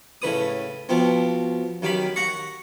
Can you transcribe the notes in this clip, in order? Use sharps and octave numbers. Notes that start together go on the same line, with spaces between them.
A2 C#3 B4 D#6
B2 F3 C4
F#2 D#3 G4 B5
F#5 A#5 C#6